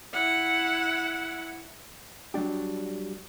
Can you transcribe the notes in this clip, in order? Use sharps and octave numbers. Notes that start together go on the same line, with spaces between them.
E4 F#5
F#3 G3 D4 G4